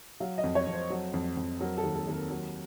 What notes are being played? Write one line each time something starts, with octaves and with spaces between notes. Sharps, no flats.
F#3 F5
D#5
F2
C#5
F2
C5
F#3
F2
F2
F#3 A#4
A4
D#2
A4
D#2
A#4
F#3